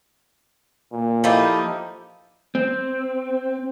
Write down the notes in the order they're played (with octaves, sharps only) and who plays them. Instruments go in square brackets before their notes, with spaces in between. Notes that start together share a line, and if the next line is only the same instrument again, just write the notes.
[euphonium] A#2
[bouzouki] F3 A#3 D#4 [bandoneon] E4 G4 A4
[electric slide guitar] C4